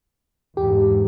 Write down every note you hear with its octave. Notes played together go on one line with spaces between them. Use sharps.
E2 G#2 G4